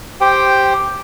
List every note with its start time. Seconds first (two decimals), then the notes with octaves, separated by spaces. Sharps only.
0.21 G4 C5 G5